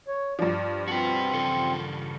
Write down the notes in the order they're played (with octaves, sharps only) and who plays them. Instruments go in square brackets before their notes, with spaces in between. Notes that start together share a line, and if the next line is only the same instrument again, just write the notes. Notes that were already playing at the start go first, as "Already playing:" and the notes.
[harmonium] C#5
[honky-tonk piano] G2 F3 [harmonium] D5
[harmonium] C4 [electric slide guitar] F#4 B4
[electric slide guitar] C#3 A4